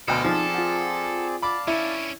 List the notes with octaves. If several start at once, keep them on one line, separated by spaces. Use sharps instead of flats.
D2 B2 A4 C5 D6 F6
F3 C4 D#4 G#4 D5
F4 F#5
D5 F5 A5 B5 D6
C#4 D4 E4